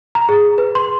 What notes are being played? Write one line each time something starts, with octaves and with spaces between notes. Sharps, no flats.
A#5
G#4
B4
C6